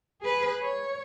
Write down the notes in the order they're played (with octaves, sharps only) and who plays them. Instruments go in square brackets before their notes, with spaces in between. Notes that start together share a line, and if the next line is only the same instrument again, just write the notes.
[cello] G#4 B4
C#5